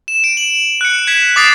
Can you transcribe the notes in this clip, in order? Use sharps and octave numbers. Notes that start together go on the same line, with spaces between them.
E7
D7
F#7
F#6 C#7
G#6 B6 E7
D6 D#6 A6 C7 D7